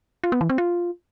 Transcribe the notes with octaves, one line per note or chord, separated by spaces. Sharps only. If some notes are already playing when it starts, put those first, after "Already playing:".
F4
B3
E3
C4
F4